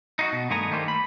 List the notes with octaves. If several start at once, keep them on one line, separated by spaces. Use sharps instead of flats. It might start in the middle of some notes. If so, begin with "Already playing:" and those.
D#4 F4 F#4
B2
G2 D#3 A3 B3 G#5 A#5
D#3 G3 A3 A#3 C5
B5